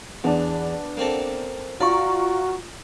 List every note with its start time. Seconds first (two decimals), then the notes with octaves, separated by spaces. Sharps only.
0.24 E2 B3 D4
0.97 A#3 C4 A4
1.80 F4 F#4 D5 A#5 C#6